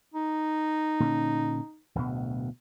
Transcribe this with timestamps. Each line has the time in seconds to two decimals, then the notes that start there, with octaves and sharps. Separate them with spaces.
0.14 D#4
1.00 A#2 D3 C#4
1.95 D1 D2 B2